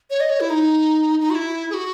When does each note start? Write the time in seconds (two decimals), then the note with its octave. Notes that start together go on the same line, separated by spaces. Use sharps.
0.10 C#5
0.20 D#5
0.30 C#5
0.40 E4
0.50 D#4
1.20 D#4
1.30 F#4
1.35 E4
1.70 G#4
1.74 F#4